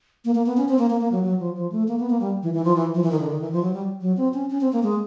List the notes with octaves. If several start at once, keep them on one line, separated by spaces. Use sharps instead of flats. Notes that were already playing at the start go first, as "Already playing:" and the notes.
A#3
A#3
B3
C#4
C4
A#3
A#3
A#3
F#3
F#3
F3
F3
A3
A#3
B3
A#3
G3
E3
E3
F3
E3
F3
E3
D#3
D3
D#3
E3
F3
F#3
G3
F#3
C4
C#4
C#4
C4
A#3
G#3